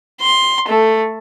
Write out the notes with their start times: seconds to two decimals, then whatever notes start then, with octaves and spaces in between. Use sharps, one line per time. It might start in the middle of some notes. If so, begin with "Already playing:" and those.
0.21 C6
0.68 A3